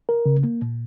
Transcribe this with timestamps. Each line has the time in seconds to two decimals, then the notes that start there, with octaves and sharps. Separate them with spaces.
0.09 A#4
0.26 C#3
0.44 A#3
0.62 A#2